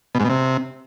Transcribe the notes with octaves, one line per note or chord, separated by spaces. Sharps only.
B2
G#2
B2
C3